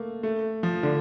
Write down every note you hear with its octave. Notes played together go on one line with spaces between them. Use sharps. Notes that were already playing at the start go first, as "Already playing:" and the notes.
Already playing: A3 A#3
A3
F3
D3